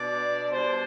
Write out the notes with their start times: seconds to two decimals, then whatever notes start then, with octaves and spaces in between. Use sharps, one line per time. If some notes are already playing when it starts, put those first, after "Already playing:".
Already playing: B2 B3 D4 D5
0.51 B2 G3 D4 C5